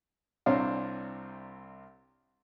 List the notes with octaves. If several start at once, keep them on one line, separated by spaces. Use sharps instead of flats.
C2 C3 C4 D4 C#5 F5